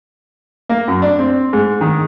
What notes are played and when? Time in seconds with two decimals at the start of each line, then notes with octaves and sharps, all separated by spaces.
0.69 A#3
0.88 F#2
1.02 D4
1.19 C4
1.53 G#2
1.81 D#3